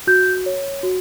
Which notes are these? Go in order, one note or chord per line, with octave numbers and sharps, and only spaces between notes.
F#4 G6
C#5
F#4